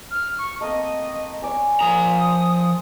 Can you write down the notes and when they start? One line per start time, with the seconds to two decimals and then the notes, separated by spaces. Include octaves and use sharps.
0.11 F6
0.38 C#6
0.61 A3 A#3 C4 D#5
1.42 C#5 D5 G#5
1.80 F3 A#4 A#5 D#6